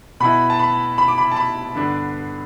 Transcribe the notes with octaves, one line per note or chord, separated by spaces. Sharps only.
B2 B3 E4 B5
A5
B5
B5
D6
B5
A5
B5
G2 D3 B3 D4